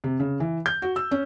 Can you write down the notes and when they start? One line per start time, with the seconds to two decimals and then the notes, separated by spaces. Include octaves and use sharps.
0.04 C3
0.20 C#3
0.40 E3
0.66 G6
0.82 F#4
0.96 E6
1.11 C#4